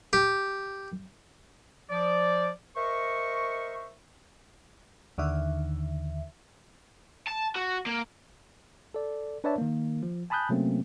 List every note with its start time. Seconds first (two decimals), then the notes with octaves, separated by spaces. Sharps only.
0.13 G4
1.90 F3 D5
2.76 A#4 C5 D#5 E5 C#6
5.18 D#2 D3 D#3 E5
7.28 A5
7.56 F#4
7.86 A#3
8.94 A4 D5
9.44 D4 B4 C#5 D5 E5 A5
9.58 D#3 A#3
10.03 F3
10.30 G#5 A5 B5 D#6 F#6 G6
10.49 C3 F#3 A3 A#3 C4 C#4